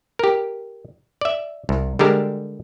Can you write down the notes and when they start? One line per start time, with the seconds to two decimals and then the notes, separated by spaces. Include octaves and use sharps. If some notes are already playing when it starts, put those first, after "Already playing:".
0.19 G4 A#4
1.21 D5 E5
1.69 C2
1.99 D3 G3 G#3 G4 A#4 A5